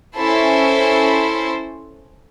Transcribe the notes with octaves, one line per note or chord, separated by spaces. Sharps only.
C#4 E4 A4 C5